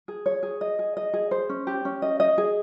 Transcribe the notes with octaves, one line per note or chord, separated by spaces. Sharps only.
G#4
C#5
G#4
D#5
G#4
D#5
G#4
C5
C#4
G4
C#4
D#5
D#5
G#4